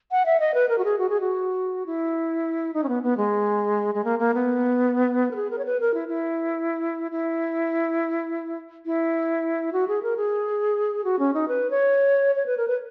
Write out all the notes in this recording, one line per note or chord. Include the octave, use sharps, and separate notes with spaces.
F#5
E5
D#5
B4
A#4
F#4
G#4
F#4
G#4
F#4
E4
D#4
C#4
B3
B3
G#3
G#3
A#3
A#3
B3
A#4
G#4
A#4
C#5
B4
A#4
E4
E4
E4
E4
F#4
G#4
A#4
G#4
F#4
C#4
D#4
B4
C#5
C#5
B4
A#4
B4